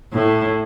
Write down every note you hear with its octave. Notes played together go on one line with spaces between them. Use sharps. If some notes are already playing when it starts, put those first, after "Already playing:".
A2